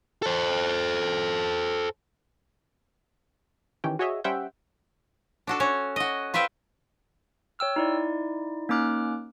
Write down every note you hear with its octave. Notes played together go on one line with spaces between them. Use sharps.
A4 C5
D#3 E3 C#4 G4
F#4 G#4 C#5 D#5 E5
G3 C#4 C5 E5 F#5 G5
D4 F#4 A4
C#4 C#5
F#4 D#5
F4 B4 C5 E5 G5
C#5 G5 E6 F6
D#4 E4 D5
A#3 C#4 D#4 D6 F6 F#6